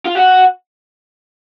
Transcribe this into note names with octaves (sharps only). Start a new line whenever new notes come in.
F4
F#4